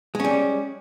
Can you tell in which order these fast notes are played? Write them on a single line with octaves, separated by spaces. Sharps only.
G#3 C#4 G3